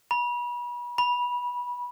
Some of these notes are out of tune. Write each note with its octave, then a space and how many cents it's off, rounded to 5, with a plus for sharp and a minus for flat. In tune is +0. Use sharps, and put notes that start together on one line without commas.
B5 -35
B5 -20